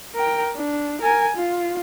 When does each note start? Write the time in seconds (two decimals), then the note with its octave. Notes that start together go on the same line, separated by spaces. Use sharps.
0.15 A#4 G5
0.56 D4
1.02 A#4 G#5
1.36 F4